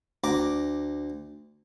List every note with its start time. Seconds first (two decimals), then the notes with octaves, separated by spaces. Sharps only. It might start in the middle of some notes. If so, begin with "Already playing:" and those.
0.24 D2 A#5 D6